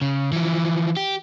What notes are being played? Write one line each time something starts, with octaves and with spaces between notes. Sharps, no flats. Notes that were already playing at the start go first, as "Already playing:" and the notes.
C#3
E3 F3
G4